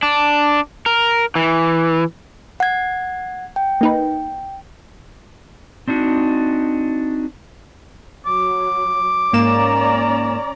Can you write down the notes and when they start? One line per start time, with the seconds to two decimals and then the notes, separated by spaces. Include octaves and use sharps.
0.03 D4
0.86 A#4
1.35 E3
2.60 F#5 G#6
3.56 G5
3.81 A#3 D#4 B4
5.88 C4 D4 D#4 F#4
8.26 F#3 D6
9.33 G#2 A#3 C#4 D5 A#5 E7